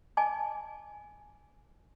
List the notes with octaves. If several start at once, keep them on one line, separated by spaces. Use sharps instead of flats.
D#5 G#5 A5 D6